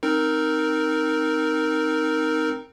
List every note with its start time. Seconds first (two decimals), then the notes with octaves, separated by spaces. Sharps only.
0.03 C4 D#4 A#4